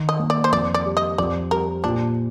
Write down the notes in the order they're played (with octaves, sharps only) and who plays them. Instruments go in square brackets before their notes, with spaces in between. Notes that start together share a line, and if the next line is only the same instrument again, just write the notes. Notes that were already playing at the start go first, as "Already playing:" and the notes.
Already playing: [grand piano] D#3
[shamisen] D#5
[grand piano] A#3
[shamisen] D5
C5
[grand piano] F2 [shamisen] D5
[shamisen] D5
[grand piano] G3
[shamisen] D#5
[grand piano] F2 [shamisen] D5
[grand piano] G3 [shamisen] A#4
[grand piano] A#2 [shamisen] D4